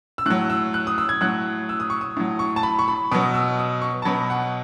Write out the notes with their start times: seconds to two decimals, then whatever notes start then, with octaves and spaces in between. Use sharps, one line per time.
0.18 E6
0.26 A2 F#3 F#6
0.50 E6
0.74 F#6
0.87 D#6
0.98 E6
1.09 G#6
1.21 A2 F#3 F#6
1.69 E6
1.80 D#6
1.90 C#6
2.01 D#6
2.17 A2 F#3
2.39 C#6
2.56 A5
2.63 B5
2.79 C#6
2.88 B5
3.12 B2 F#3 D#6
3.34 E6
3.59 D#6
3.82 C#6
4.02 A5
4.05 B2 F#3 B5
4.30 F#5